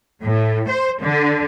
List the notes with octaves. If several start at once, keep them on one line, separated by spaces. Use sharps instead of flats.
A2
C5
D3